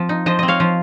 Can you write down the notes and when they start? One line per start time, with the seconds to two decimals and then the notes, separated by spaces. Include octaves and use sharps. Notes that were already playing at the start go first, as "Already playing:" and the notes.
Already playing: F3 C4
0.09 D#4
0.26 F3 C5 D#5
0.39 C4 D#5
0.48 C#5 F5
0.60 F3